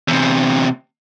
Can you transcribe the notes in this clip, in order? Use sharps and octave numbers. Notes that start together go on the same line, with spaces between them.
E2 C3